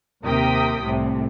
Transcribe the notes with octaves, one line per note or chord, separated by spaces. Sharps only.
D#2 C3 A#4 G5 D#6 B6
C2 A2 C3